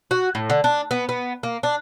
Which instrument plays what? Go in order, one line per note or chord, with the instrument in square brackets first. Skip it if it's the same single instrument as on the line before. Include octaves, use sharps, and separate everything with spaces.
[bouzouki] F#4
A2
D3
D4
B3
B3
A#3
D4